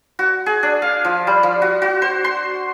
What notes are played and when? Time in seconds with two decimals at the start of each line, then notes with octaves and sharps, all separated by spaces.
0.19 F#4
0.46 G#4
0.63 D4
0.82 F5
1.05 F3
1.27 G3
1.43 F3
1.62 F#4
1.82 F#4
2.02 C5
2.24 C6